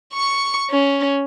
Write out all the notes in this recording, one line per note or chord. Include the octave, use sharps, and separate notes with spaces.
C#6 C#7
C#4